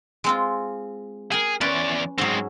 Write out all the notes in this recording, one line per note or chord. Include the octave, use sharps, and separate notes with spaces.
G#3 C4 F4
G#4 A#4 G5
E2 C#4 B4 D5 C6
G#2 F#3 G#3 C4